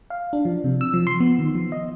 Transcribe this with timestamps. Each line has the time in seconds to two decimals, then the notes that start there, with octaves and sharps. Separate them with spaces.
0.10 F5
0.33 D4
0.45 F3
0.64 C3
0.81 E6
0.94 F3
1.07 C6
1.20 B3
1.39 D#3
1.55 F3
1.72 D#5